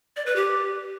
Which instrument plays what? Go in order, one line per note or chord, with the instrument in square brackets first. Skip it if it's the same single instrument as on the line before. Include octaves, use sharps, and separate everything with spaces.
[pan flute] D5
B4
G4